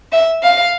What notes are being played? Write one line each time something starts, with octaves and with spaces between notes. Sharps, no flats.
E5
F5